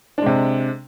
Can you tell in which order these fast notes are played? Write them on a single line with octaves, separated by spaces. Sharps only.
D4 G#3 C3